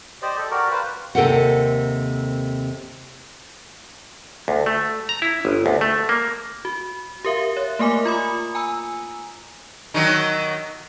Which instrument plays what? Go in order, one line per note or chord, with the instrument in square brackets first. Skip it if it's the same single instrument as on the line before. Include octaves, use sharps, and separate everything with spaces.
[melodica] G4 C5 D5 D#5
A4
F#4 G4 A#4 D5
B4 C5 F5
[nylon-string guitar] D#2 C3 A4 A#4 C5 F#5
[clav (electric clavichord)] D2
A3
A#5
E4
G1
D2
A3
A#3
[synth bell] F#4
G4 A#4 E5 F5
C#5 E5
A3 A#3 A#4 G#5 D6
F4 B5 D#6
G#5 A#5 E6
[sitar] D#3 F#3 D#4